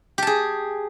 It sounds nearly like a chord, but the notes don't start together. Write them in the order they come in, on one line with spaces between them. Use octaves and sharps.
G4 A5 G#4